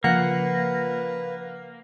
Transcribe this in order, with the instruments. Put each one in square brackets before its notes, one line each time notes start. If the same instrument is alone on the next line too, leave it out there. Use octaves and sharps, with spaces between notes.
[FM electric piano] C#3 F3 [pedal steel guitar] A#3 [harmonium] B4 [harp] F#5